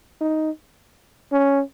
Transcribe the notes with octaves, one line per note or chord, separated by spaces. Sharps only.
D#4
C#4